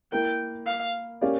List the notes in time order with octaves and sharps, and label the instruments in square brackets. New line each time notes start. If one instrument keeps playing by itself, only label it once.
[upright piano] A#3 E4 A#4 [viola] G5
[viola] F5
[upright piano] A#3 C#4 G4 D5 F5